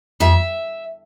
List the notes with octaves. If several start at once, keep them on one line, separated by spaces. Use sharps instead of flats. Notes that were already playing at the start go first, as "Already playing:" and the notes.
F2 E5